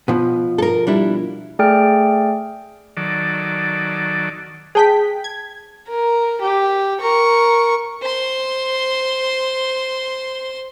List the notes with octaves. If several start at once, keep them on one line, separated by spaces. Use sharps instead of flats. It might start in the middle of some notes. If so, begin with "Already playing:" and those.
B2 F3
A4 A#4
G3 D4 E4
A3 G#4 D5 G5 F6 D7
D#3 F#3 A4 D5
G#4 C5 G5 A5 B6
G#6
A#4
G4
A#4 C#6
C5 C6